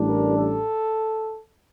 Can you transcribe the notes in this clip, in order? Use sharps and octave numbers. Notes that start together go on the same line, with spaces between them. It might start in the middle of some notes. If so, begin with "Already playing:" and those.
Already playing: A1 A2 G3 D4
A#4
A4